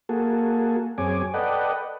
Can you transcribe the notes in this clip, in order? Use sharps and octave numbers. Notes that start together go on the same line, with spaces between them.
A#3 F#4 G#4 A4
F#2 C4 G#4 C#5 G#5 D6
A4 B4 D5 D#5 F#5 G5